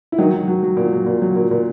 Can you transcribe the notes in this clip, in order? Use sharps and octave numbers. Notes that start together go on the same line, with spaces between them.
E4
D#3 F#3 D#4
F#3
F#3
F#3
A#2
F#3
A#2
F#3
A#2
A#2